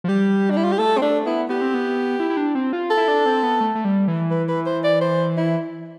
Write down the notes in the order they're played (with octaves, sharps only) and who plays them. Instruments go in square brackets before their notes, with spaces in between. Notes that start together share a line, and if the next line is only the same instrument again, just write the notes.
[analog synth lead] F3
[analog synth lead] G3 [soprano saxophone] G4
[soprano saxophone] D4
E4
F4
G4
[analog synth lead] A3 [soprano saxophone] A4
[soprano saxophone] C4
[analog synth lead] A3 [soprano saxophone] D4
[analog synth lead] B3 [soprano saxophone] E4
[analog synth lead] B3 [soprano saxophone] G4
[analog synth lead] C4
B3
E4
E4
D4
C4
F4
[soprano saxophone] A4
[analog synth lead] E4
D4
C4
B3
A3
A3
G3
E3
[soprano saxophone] B4
B4
C5
D5
C5
E4